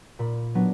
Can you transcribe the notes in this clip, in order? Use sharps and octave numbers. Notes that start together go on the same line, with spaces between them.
A#2 B5
F#3 B3 D4